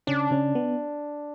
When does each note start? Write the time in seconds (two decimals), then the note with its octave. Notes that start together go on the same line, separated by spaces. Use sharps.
0.07 C#3 C#4 D4
0.31 C#3 C#4
0.55 B3